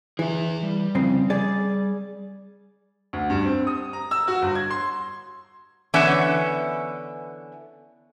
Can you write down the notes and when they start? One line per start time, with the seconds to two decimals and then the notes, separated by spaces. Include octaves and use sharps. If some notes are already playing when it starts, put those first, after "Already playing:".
0.19 E3 G#4 E5
0.63 G3
0.95 F2 C#3 C4
1.30 G#4 D5
3.13 D2
3.30 G2
3.44 C4
3.67 D#6
3.93 A#5
4.11 E6
4.28 F#4
4.42 G1
4.55 G#6
4.70 C6
5.94 D3 E3 B3 C#4 C#5 E5